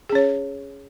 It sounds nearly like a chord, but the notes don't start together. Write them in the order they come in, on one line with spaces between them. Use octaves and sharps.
G#4 C#4 C#5